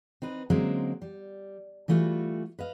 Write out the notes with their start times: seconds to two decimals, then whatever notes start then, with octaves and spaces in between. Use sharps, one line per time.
0.22 C4 D#4 B4
0.50 D3 F#3 G#3 A#3 C4 C#4
1.02 G3
1.88 E3 G3 A3 F4 F#4
2.59 B4 D#5 F5